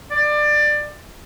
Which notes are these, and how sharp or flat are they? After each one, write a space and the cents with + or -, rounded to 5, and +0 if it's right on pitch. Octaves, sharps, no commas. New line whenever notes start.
D5 +20